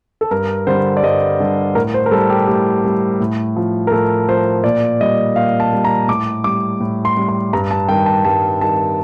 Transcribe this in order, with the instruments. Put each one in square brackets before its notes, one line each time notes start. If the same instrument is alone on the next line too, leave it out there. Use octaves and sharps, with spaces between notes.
[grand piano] A4
G2 A#4
D3 G3 C5
D5
G2 D#5
D3 G3
A2 A#4
C5
A#4
G3 A4
G4
A2 G4
G3
A2
F3
A#4
A2 A4
F3 C5
A#2 D5
G3 D#5
A#2 F5
A5
G3
A#5
A2 D6
G3 D6
A2
C6
G3
C6
G2 A#5
A5
D#3 G3 G5
A5
G2 A5
D#3 G3 A5